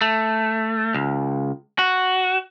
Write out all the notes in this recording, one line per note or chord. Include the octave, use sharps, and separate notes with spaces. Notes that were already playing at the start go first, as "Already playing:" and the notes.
A3
C#2
F#4